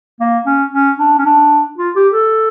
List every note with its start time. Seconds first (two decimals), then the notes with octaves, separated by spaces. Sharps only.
0.20 A#3
0.46 C#4
0.73 C#4
0.99 D4
1.18 C#4
1.26 D4
1.78 F4
1.96 G4
2.13 A4